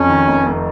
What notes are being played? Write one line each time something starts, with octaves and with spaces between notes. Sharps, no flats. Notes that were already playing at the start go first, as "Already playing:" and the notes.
Already playing: F2 C#4
D#3
F1
F1